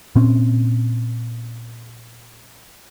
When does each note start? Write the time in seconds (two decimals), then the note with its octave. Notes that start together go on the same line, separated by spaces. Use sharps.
0.16 A#2 C4 C#4